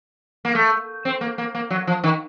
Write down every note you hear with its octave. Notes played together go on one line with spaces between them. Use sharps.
A#3
A3
C4
A#3
A#3
A#3
F#3
F3
D#3